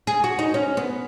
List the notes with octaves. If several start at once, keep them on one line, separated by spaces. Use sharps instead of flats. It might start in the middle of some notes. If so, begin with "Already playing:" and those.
G#4
F#4
D#4
C#4
B3